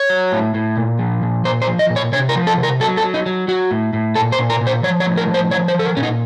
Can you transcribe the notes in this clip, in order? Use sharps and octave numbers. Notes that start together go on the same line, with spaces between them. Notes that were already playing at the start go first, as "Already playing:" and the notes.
Already playing: C#5
F#3
A2
A2
A#2
F3
A#2
A#2 C5
C5
F3
D#5
A#2
C#5
C3 C#5
A#4
F3
A4
C3
A#4
F#3 A4
A4
F#3
D#4
F#3
F#3 F#4
A2
A2
A#2 A4
C5
A#2
A#4
A#2
C5
F3 C#5
C#5
A2
A#4
F3
C5
F3 C#5
C5
F3 A4
A#4
A#2 C#4
D#4